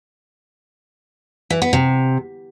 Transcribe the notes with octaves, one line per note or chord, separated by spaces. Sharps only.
E3
B3
C3